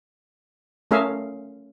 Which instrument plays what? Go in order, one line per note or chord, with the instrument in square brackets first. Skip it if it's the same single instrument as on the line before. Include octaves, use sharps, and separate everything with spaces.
[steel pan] A3 C#4 G#4 A#4 E5 F5